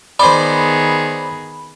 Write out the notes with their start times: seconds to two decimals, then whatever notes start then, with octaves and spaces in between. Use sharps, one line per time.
0.19 D#3 B3 G#4 C5 D5 B5